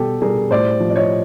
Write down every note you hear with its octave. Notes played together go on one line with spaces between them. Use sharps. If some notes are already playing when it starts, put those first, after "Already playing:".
Already playing: B2 G3 G4 A4
G3 G#4 A#4
A2 C5 D5
F3
D5
C#5 D#5